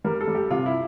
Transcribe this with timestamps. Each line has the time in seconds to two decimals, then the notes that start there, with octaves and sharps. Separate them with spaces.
0.04 G3 A#4
0.21 A4
0.28 G3
0.35 G4
0.51 C3 F4
0.66 E4